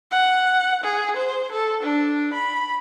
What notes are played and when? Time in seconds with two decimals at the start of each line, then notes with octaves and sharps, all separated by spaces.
0.11 F#5
0.84 G#4
1.17 C5
1.52 A4
1.83 D4
2.34 B5